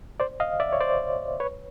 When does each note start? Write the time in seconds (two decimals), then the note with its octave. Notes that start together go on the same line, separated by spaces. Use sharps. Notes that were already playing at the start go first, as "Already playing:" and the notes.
0.20 C5 D5
0.40 D#5 F5
0.60 D5 E5
0.73 C#5
0.81 C5 D5
1.40 B4 C#5